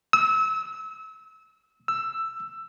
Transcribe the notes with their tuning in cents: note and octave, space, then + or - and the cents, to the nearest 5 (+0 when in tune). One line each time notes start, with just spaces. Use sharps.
E6 -30
E6 +10